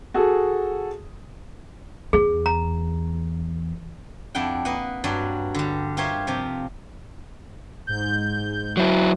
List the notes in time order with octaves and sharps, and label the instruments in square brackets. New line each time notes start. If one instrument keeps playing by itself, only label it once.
[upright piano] F#4 G#4 A4
[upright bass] E2 [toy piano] G#4
[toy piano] A#5
[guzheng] F2 D4 E4 F#5 G5
A#3 B4 D#5 F#5
G2 F#3 F#4 D5
D3 G3
F4 G4 A#4 C5 C#5 E5
C3 F3 G4
[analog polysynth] G#2 G6
[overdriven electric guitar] F#3 E4